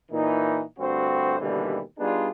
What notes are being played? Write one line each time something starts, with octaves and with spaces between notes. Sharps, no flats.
A#2 E3 D#4
D2 G2 C4 F#4 C5
D#2 B2 D3 E3 G3
G3 B3 D4 D#4 F4 G#4